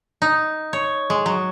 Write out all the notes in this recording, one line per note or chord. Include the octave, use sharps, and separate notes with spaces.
D#4
C#5
G#3
F#3